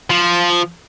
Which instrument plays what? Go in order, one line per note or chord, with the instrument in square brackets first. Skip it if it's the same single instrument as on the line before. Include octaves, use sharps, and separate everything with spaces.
[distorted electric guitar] F3